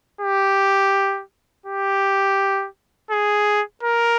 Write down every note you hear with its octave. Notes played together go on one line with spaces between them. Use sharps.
G4
G4
G#4
A#4